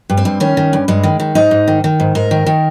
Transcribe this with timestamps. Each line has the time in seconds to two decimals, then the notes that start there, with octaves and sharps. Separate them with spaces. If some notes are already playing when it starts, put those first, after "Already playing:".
0.10 G2
0.17 C4
0.25 G2
0.40 D#3 C#4
0.57 D#3
0.73 G2
0.88 G2 G#3
1.04 D#3
1.20 D#3
1.35 G#2 D#4
1.51 G#2
1.68 D#3
1.84 D#3
2.00 G#2
2.15 G#2 A#4
2.31 D#3
2.47 D#3